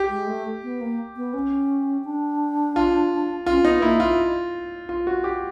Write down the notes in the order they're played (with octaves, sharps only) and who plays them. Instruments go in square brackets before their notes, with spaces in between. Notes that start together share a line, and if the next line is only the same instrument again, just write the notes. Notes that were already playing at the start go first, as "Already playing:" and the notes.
Already playing: [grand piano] G4
[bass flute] G#3
A3
B3
A#3
B3
C#4
D4
[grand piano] F4
[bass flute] C#4 [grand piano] F4
[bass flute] B3 [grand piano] D#4
[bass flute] A#3 [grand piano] E4
[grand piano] F4
F4
F#4
G4